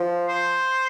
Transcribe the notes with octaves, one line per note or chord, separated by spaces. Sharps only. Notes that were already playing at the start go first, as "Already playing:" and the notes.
Already playing: F3
C5